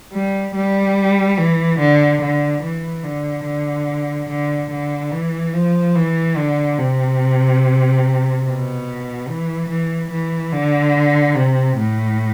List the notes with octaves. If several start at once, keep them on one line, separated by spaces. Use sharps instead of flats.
G3
G3
E3
D3
D3
E3
D3
D3
D3
D3
E3
F3
E3
D3
C3
B2
E3
E3
E3
D3
C3
A2